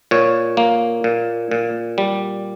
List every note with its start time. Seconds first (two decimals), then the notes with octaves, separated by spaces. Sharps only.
0.11 A#2 C#5
0.57 A#3
1.04 A#2
1.51 A#2
1.98 G3